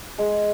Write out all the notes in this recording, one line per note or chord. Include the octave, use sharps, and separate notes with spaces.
G#3